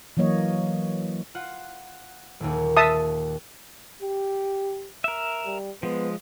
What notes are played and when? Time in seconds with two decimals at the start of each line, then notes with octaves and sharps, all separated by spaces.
0.17 E3 F#3 A#3 C#5 D#5
1.35 F4 F#5
2.40 D#1 D#2
2.77 E5 A5 D#6
4.02 G4
5.04 A#4 E5
5.46 G3
5.83 F3 G#3 B3